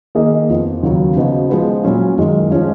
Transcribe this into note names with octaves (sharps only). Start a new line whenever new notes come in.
D#3 A#3 D#4 G#4 D#5
F2 F3 B3
D#2 C#3 F#3
C#3 F3 B3 D#4 F#4
F3 G#3 B3
A#2 F#3 C#4 F4
F#2 D#3 G#3
F3 G#3 C#4 F4